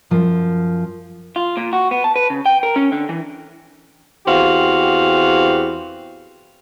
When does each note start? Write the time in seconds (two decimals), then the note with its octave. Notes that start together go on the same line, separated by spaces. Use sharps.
0.11 F#2 F3
1.36 F4
1.57 A#2
1.73 F#4
1.91 B3
2.04 A5
2.16 B4
2.30 C#3
2.46 G5
2.63 A#4
2.76 C#4
2.92 D3
3.09 E3
4.26 E2 E3 C4 F#4 G4 F5